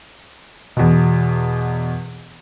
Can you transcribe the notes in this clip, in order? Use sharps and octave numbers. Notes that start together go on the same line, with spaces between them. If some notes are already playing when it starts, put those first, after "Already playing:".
E2 B2